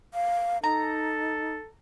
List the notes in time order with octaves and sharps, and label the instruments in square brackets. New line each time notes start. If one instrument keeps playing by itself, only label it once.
[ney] F5
[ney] D#4 [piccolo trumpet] A4 [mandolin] A#5